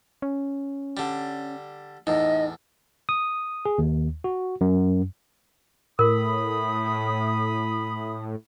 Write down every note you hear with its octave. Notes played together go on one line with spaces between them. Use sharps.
C#4
D3 G3
E2 A2 D#4 D#5
D#6
G#4
D#2
F#4
F#2
A2 A#4 B5 D#6